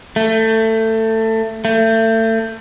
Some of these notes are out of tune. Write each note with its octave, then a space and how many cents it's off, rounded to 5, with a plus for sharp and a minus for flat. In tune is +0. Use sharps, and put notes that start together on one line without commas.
A3 +20
A3 +30